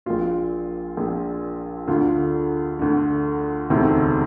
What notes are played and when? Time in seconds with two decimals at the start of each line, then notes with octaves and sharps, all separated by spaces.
0.06 A#1 A#2 F4
0.97 A#1 A#2
1.88 D2 D3 F4
2.79 D2 D3
3.70 E1 D2 C3 D#3